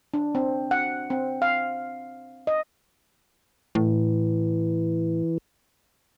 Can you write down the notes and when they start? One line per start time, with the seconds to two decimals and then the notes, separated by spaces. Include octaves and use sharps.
0.14 D4
0.35 C4
0.71 F#5
1.10 C4
1.42 F5
2.47 D#5
3.75 A2 E3